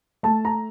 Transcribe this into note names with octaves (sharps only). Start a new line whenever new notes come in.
A3 A5
A#5